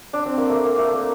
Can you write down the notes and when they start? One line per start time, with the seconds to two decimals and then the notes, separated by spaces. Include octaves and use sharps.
0.13 D4
0.26 C4
0.38 A#3
0.50 A3
0.65 A#3
0.79 A3
0.93 A#3